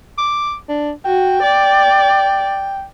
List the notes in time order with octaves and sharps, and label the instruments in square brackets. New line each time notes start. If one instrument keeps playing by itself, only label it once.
[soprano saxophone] D6
D4
[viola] F#4 [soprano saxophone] G5
[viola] D5